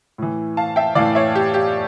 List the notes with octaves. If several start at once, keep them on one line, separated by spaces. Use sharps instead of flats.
A2 E3
F5 A5
E5 G5
A2 E3 D5 F5
C#5 E5
G4
G4